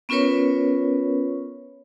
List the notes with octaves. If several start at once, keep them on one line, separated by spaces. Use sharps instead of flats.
B3 C#4 F4 A#4 B4 C#5